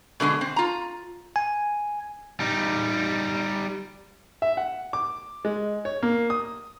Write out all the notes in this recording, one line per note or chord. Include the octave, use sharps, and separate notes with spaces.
B2 D3 G3 G#3
C4
F4 A#5
G#5
G3 D#4
E5
F#5
D6
G#3
C#5
A#3
D#6